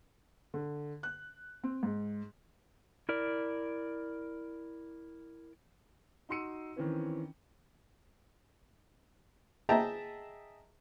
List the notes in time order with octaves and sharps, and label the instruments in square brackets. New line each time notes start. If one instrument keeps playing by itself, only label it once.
[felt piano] D3
F#6
C4
G#2
[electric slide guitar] E4 A#4 D5
[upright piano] D#4 F#4 C6 E6 C#7 D#7
D#3 E3 C4 C#4 E4 B4
[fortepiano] G#4 D#5 E5 G5 A5 A#5